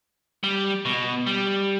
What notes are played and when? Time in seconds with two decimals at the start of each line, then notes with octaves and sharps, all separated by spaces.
0.44 G3
0.85 B2
1.27 G3